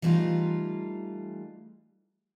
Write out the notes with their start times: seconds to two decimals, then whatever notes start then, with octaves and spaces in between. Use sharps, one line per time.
0.02 E3 G3 A3 D#4 F4